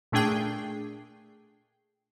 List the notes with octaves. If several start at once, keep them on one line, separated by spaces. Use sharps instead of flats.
A#2 A3 D4 G#4 G5 C7